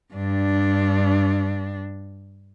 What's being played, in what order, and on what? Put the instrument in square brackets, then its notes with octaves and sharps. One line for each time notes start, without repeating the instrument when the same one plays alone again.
[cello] G2 D4